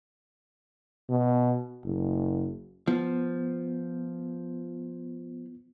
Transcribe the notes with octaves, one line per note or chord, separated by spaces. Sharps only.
B2
F#1
F3 B3